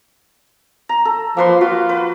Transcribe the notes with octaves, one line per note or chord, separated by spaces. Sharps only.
A#5
A4
F3 A#3 B4 C6
F4 F#4
B4